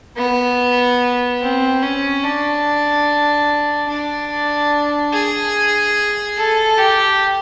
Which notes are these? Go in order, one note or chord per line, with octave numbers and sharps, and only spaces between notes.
B3
C4
C#4
D4
D4
G#4
A4
G4